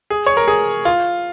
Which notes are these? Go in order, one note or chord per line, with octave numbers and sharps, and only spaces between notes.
G#4
C#5
A#4
G#4
F4